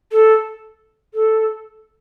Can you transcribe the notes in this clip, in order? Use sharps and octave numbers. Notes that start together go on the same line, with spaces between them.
A4
A4